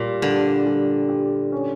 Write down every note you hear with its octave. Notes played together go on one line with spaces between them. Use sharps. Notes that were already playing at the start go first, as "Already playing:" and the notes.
Already playing: A#2 G3
D3 G3
G3
G4
C#4